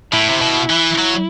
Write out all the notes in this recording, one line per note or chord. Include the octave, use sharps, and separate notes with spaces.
A2 E4
C3
B2
E3
F#3